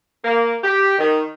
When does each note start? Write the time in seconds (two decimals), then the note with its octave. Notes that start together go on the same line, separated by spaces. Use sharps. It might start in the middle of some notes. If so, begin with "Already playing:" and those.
0.24 A#3
0.63 G4
0.98 D#3